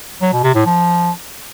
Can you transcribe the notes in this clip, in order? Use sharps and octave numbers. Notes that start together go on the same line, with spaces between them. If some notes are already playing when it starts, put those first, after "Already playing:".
F#3
B2
C3
A2
F3